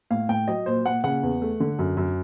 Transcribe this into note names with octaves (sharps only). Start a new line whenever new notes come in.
A2 F5
A2 G5
F#3 D#5
A#2 C5
A#2 F#5
C#3 F#5
E2
A3
D3
F#2
F#2